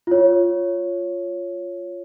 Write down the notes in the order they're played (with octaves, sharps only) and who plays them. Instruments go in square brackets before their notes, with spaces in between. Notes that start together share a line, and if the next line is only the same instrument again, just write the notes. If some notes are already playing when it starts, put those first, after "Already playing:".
[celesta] F4 C#5